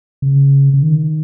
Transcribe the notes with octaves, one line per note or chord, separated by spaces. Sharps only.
C#3
C#3
D#3